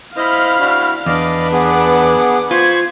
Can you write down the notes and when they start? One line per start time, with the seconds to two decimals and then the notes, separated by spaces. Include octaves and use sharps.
0.17 E4 C5 D#5 F5 B5 F6
0.60 D4 E4 F#4
1.06 E2 D4 B4 D5 D#5 F5
1.53 B3 G#4 F#5 D6
2.51 F4 C5 B5 C#6 G#6